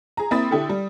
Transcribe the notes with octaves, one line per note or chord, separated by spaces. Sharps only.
G#4 A#5
A#3 C4 E4 B5 D#6 A6
D3 E4 G4 A4
G3